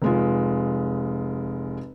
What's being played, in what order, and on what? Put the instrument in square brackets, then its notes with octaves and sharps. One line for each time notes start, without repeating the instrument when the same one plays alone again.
[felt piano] F1 G#3 F4